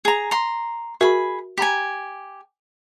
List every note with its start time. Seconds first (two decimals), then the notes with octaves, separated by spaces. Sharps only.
0.05 G#4 A#5
0.31 A#5 C6
1.01 F#4 G#4 A#4 E5 B5
1.58 G4 G#5 A#5 B5 B6